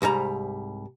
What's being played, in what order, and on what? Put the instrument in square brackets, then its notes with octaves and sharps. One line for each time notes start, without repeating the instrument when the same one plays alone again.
[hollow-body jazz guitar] C2 G#2 G3 A#5